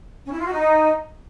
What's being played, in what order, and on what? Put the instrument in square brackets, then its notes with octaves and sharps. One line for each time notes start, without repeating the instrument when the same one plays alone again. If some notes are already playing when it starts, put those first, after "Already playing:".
[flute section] C#4
E4
F4
F#4
D#4